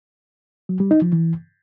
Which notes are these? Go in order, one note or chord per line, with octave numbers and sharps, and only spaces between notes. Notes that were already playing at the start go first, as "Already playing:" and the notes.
F#3
G3
D#4
F3
E3